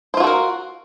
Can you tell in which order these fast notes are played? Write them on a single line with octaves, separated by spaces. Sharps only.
C5 F4 F#4 A4 A#4